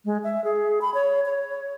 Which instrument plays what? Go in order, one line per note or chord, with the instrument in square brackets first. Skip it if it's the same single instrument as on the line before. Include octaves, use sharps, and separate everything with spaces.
[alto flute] G#3
E5
G#4
B5
C#5
C#5